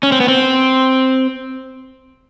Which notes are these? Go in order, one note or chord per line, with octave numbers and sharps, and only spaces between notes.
C#4
C4
B3
C4